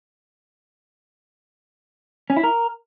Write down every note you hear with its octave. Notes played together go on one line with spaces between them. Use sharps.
C#4
E4
A#4